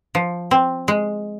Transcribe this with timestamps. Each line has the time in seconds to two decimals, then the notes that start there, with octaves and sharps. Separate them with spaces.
0.15 F3
0.51 C4
0.88 G#3